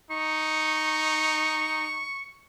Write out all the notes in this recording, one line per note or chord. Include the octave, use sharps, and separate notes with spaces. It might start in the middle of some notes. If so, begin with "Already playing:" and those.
D#4 C#6